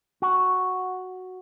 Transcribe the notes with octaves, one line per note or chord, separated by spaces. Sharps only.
F#4